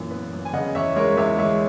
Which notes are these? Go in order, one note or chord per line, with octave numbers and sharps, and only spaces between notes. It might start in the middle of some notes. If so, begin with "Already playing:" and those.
Already playing: F#2 A#2 E3
B3
F#2
G#5
C#3 D#5 F#5
E2 C#5 E5
G#3 A#4 C#5
E2 C#5 E5
G#3 C#5 E5